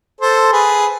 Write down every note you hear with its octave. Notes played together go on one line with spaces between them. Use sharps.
A4 C5
G#4 B4